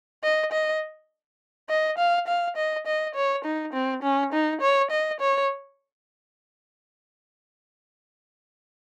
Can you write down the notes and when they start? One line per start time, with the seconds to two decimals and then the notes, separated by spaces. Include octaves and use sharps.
0.23 D#5
0.52 D#5
1.70 D#5
1.98 F5
2.28 F5
2.56 D#5
2.87 D#5
3.15 C#5
3.45 D#4
3.73 C4
4.03 C#4
4.33 D#4
4.61 C#5
4.91 D#5
5.20 C#5